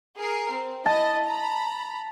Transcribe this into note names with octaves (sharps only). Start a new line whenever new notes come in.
G#4 A#4 C7
C4
E4 D#5 A5
A#5 B5